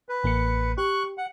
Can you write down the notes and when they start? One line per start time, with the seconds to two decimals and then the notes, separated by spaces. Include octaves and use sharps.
0.09 B4
0.23 A1 A#3 C#7
0.78 G4 C#6 F#6
1.18 F#5